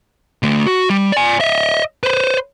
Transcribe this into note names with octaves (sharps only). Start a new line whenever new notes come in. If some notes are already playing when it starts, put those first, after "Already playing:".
D3 A3
F#4
G3
D5 G#5
D#5 E5
B4 C5